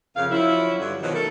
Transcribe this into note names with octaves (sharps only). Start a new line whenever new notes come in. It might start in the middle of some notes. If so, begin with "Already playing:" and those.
F2 C#3 A#4 F5
F3 F#3 C#4 E4
G2 D3 F#3
B2 D#3 F3 F#3
A3 A4 A#4